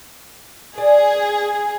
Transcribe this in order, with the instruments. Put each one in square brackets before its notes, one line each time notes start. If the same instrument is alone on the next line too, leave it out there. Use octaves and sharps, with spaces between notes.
[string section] G#4 [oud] D5